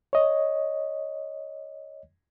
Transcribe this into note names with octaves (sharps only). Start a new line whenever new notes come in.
C#5 D#5